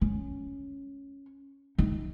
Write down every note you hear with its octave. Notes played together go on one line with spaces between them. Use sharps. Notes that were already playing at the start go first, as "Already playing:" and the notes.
C#4
D#4